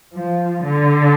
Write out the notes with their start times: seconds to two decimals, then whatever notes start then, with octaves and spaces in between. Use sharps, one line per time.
0.14 F3
0.64 D3